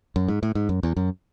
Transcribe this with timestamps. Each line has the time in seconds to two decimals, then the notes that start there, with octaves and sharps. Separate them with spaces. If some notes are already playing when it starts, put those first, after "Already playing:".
0.16 F#2
0.28 G#2
0.43 A2
0.55 G#2
0.69 F#2
0.83 E2
0.97 F#2